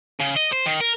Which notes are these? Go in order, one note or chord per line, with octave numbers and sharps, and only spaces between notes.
C#3
D#5
C5
D#3
A#4